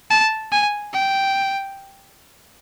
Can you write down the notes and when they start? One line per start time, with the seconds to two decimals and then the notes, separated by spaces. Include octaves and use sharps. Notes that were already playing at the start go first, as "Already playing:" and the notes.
0.11 A5
0.52 G#5
0.94 G5